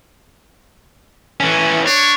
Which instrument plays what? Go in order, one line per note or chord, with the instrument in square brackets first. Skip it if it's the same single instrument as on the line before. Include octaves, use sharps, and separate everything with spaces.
[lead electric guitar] E3 C#4
[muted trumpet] D4 [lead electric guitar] C#5